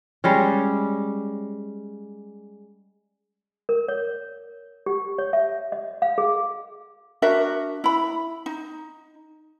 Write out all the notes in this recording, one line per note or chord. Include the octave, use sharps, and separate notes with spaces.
G3 G#3 C#4
A#4
C#5
G4
C#5
E5
D#5
F5
G#4
D4 F#4 A#4 E5
E4 B5
D#4